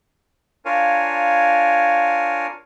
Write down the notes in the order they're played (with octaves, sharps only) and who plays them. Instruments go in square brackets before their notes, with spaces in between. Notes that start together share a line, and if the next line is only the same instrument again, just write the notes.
[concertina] D4 F4 A#4 C#5 F5 G#5